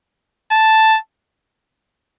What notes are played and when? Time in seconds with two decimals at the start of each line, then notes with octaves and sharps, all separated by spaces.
0.52 A5